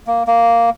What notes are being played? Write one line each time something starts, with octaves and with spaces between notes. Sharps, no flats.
A#3
A#3